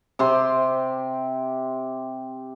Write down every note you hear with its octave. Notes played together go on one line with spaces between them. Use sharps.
C3 G4 C6